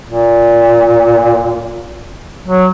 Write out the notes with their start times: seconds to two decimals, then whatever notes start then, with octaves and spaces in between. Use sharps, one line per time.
0.07 A#2
2.48 F#3